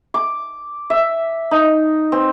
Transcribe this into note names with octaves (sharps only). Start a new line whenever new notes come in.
D6
E5
D#4
C4